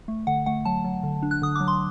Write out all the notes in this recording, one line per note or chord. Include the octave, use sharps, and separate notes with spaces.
A3
D3 F#5
A3 F#5
F#3 A5
F#3
D3
D4
F#6
D3 D#6
F#3 D6
C6